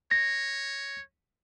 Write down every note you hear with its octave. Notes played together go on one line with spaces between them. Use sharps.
C#5 A#6